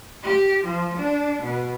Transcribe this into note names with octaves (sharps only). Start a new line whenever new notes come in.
G4
F3
D4
B2